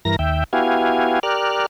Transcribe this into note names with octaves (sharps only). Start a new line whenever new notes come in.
G2 E3 A#4 A#6
D#2 E5 G5
B3 E4 F#4 G4 F5 G#5
G4 A#4 D5 F6 F#6